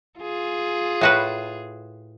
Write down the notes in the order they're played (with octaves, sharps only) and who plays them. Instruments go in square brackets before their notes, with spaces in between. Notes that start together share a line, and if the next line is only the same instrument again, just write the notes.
[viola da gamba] F4 G#4
[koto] A2 F#4 B4